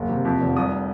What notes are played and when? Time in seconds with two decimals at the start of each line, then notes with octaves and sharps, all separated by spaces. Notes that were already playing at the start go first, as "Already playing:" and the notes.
Already playing: F#1
0.09 C3
0.25 F2
0.40 F1
0.57 C2 D#6